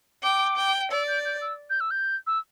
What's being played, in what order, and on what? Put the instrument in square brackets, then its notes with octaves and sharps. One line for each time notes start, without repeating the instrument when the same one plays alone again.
[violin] G5 [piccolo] D6
[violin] G5
[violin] D5 [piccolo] E6
[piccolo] G6
G6
E6
G6
E6
G6
E6